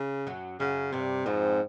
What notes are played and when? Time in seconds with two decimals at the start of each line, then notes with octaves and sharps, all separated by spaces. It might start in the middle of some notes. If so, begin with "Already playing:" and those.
Already playing: C#3
0.27 F#2 F#3
0.60 F#2 C#3 F#3
0.93 G2 C3 G3
1.26 F2 G#2 F3